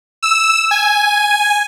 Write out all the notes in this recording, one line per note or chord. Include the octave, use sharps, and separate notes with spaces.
E6
G#5